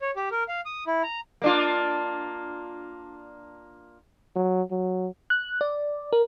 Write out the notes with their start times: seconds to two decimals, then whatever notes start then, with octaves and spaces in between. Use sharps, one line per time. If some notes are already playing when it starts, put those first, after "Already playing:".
0.01 C#5
0.16 G4
0.31 A#4
0.48 F5
0.66 D#6
0.87 E4
1.03 A#5
1.42 A#3 D4 F4
4.36 F#3
4.71 F#3
5.30 F#6
5.61 D5
6.13 A#4